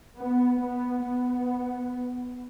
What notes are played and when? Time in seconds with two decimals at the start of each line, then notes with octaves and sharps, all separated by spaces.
0.16 B3
0.58 B3
1.02 B3